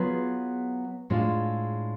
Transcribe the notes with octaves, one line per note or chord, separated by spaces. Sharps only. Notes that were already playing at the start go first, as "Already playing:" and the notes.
Already playing: F#3 B3 F4 G#4 B4
A2 G#3 D4 F4